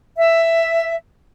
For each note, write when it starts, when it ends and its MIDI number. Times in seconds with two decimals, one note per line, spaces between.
0.17 0.95 76